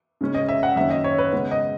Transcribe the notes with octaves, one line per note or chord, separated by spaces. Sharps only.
C#3 G#3 C#4
D#5
E5
F#5
F#2 D#3 A#3 C#4 E5
D#5
C#5
B4
C#3 G#3 B3
D#5